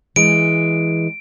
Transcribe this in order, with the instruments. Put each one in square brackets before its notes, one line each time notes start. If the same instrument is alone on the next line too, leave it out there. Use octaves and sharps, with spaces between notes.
[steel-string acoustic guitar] E3 G#3 [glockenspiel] D7